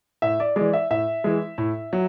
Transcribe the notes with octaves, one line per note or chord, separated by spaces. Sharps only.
A2 E5
D5
E3 G#3 D5
E5
A2 E5
E3 G#3
A2
F#3